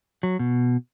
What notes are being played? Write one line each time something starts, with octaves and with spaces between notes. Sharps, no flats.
F#3
B2